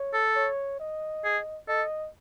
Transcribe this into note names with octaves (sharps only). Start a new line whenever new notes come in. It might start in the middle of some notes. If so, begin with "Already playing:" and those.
Already playing: C#5
A4
C#5
D#5
G#4
A4 D#5